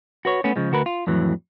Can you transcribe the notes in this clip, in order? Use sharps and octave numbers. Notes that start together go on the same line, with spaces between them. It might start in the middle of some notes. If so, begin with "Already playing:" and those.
F#4 B4 C#5
A3 B3 C#4
C#3 F3 G#3
D2 F#4 A#4 B4
F4
F2 A2 E3 F#3